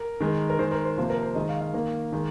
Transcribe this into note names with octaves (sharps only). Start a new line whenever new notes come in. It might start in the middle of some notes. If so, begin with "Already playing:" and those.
Already playing: A#4
D#3 G#3
A#4
D#3 G#3 C5
A#4
C5
C3 F3 A#3 C5
A#4
C5
D#3 G#3 D#5
F5
F5
D#3 A#3
D#3 G#3